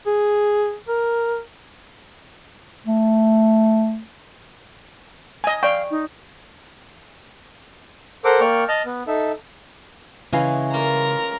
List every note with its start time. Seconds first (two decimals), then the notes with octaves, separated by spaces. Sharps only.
0.07 G#4
0.88 A#4
2.87 A3
5.44 D#5 G#5
5.63 D5 F5 G5 B5 C#6
5.91 D#4
8.25 A4 A#4 C5 F#5 D6
8.40 A#3 D5 G5 C#6 F6
8.68 D#5 A5 F6
8.86 B3
9.07 D#4 A4 E5
10.33 C#3 E3 G#3 C#4 E4 F5 G#5
10.73 A#3 F4 A#4 A#5